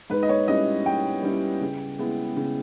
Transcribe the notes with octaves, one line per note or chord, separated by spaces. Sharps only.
G#2 B4
D#5
C#5
G3 C#4 E4 D#5
G#2 G5
G3 C#4 E4
C#3
G#3 B3 E4
C#3